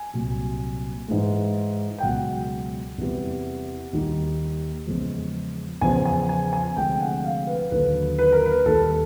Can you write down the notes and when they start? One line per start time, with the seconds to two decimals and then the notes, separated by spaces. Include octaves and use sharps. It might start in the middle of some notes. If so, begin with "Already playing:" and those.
Already playing: G#5
0.13 C2 A#2 F#3
1.08 G#2 E3 G#3
1.98 G5
2.03 C#2 B2 F#3 F#5
2.98 E2 C3 E3 G3
3.93 D#2 D#3 G3
4.87 E2 C#3 F3 G#3
5.81 E2 C#3 F3 G#5
6.05 G#5
6.29 G#5
6.53 G#5
6.77 D2 C3 F3 G#3 G5
7.00 F#5
7.24 F5
7.47 B4
7.71 D#2 D3 F#3 B4
8.19 B4
8.32 A#4
8.46 B4
8.65 D#2 D#3 G3 A4